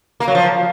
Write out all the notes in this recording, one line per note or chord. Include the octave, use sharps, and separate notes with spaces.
A#3
F#3
F3